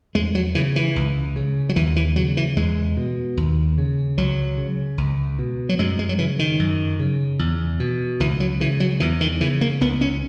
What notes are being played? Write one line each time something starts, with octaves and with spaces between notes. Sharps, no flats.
E2 G#3
F#3
C#3 E3
E3
C#2
C#3
F#3
D#2 E3
E3
C#3 F#3
E3
E2 G#3
B2
D#2
C#3
C#2 F#3
C#3
C#2
B2
F#3
F#2 G#3
G#3
F#3
C#3 E3
D#3
F#2
C#3
E2
B2
C#2 E3
F#3
C#3 E3
F#3
E2 E3
D#3
C#3 E3
A#3
C#2 B3
C#4